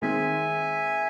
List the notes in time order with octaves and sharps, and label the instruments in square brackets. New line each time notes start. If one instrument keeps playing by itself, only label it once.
[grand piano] D#3 G#3 C4 [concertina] E5 G#5